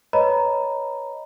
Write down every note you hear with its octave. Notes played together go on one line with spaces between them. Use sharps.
B4 C#5 D#5 A#5 B5